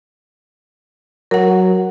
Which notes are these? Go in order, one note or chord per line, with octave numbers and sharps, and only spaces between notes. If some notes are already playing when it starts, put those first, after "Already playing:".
F#3 A#4 F#5